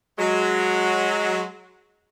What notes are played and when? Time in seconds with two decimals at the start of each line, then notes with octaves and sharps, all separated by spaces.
0.19 F#3 G#3